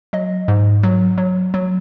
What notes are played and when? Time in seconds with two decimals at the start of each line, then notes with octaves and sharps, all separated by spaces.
0.13 F#3 D#5
0.48 G#2
0.83 F#3
1.18 F#3
1.54 F#3